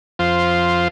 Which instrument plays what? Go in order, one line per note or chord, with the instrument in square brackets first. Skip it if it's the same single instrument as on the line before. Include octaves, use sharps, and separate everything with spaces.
[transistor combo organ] F2 F4 C5